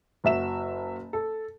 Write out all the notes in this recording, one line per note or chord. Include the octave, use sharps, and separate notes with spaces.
F#1 F#4 E5 E7
A4